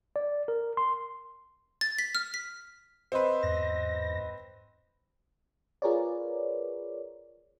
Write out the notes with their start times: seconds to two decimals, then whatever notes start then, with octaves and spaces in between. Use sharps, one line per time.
0.16 D5
0.48 A#4
0.77 C6
1.81 A6
1.99 B6
2.15 F6
2.34 B6
3.12 C4 B4 C5 D#5 C6
3.43 E2 G#2 A#6
5.82 F4 G#4 A#4 B4 C#5 D5